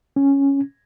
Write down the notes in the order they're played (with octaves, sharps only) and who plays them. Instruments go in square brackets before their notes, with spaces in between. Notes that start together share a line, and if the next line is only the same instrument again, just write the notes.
[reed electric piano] C#4